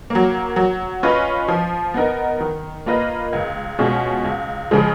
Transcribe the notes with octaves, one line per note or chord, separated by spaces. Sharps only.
F#3 A#3
F#3
C#4 F4 B4 D#5
F3
B3 D#4 A#4
D#3
A#3 F4 B4 D#5
C#2
B2 G#3 C#4 F4
C#2
C#3 F3 G#3